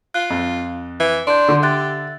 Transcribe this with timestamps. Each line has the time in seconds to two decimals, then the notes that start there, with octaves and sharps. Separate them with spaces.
0.14 F4 F#6
0.30 F2
1.00 E3
1.27 D4 C6 G6
1.48 D3
1.63 G4 E5 F#6 A6